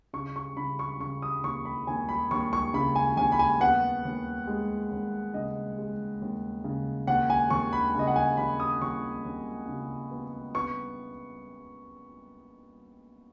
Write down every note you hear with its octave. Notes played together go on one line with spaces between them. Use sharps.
C#3 C#6
C#6
C#3 B5
C#6
C#3 C#6
D#6
D#2 C#6
B5
D#2 G#5
B5
D#2 C#6
C#6
C#3 B5
G#5
D#2 G#5
B5
G#5
B3 F#5
D#2
G#3
D#2
C#3 D#5
G#3
D#2
C#3
D#2 F#5
G#5
D#2 C#6
B5
C#3 D#5
F#5
G#5
D#2 B5
D#6
D#2 C#6
D#2
C#3
B3
B3 C#6